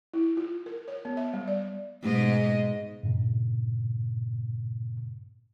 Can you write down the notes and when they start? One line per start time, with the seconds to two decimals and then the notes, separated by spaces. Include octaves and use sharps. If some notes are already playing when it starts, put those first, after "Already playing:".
0.14 E4
0.37 F4
0.66 A#4
0.88 C#5
1.05 B3
1.17 E5
1.34 G3
1.48 D5
2.03 G#2 B2 D#5
3.03 G2 A#2 C#3